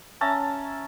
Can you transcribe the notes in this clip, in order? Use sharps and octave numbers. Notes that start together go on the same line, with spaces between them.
C#4 E5 A5 A#5